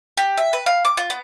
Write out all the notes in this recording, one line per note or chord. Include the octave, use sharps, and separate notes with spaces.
G4
E5
B4
F5
D6
F4
B3